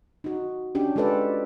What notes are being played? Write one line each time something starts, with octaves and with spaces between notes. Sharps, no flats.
D#4 F#4
C#4 D4 G4
G#3 F4 G4 A4 B4 D5